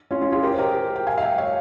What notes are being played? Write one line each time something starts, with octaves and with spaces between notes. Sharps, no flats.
C#4 F4
C#4 F4
F4 G#4
G4 A#4
C5
G4 A#4
G5
F5 G#5
F5
E5 G5
C#5 F5